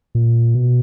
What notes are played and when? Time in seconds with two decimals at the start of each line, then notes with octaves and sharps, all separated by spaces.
0.15 A#2
0.54 B2